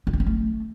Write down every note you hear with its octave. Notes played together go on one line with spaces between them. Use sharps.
D#4
D4
C#4
A3